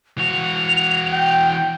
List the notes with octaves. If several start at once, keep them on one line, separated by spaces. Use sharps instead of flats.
E3 F#4 F7
G5